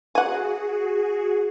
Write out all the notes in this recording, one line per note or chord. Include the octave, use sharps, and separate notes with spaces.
F#4 G#4 F#5 G#5